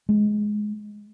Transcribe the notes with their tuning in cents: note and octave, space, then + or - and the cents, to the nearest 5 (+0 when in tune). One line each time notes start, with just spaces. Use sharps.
G#3 +15